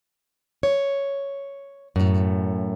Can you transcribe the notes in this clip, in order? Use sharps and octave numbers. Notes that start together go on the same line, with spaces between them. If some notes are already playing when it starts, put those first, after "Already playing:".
C#5
F#2 A2